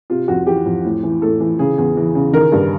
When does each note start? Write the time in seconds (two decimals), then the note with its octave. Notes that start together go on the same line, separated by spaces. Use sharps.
0.10 C3 F4
0.28 F2 F#4
0.47 E3 G4
0.66 F2
0.84 A2
1.03 E3
1.22 A2 A4
1.40 E3
1.59 C#3 G#4
1.78 E2 G#4
1.97 E3
2.15 C#3
2.33 D#3 A#4
2.52 G2